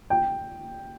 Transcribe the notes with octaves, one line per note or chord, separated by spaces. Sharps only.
G5